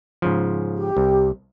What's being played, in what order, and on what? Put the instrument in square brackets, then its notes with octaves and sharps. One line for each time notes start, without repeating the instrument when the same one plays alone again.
[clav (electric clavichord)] G#2 C#3 F3
[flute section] G4
[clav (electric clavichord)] C2